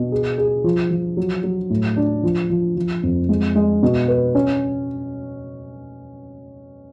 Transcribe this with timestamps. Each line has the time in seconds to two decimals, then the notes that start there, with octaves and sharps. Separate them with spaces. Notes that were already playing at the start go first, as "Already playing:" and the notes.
Already playing: B2
0.12 G#4
0.38 G#4
0.64 F3
0.91 F3
1.17 F#3
1.44 F#3
1.70 A2
1.97 D4
2.23 F3
2.50 F3
2.77 F3
3.03 F2
3.29 G#3
3.55 G#3
3.83 B2
4.08 B4
4.35 C#4